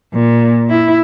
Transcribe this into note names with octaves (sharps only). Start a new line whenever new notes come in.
A#2
E4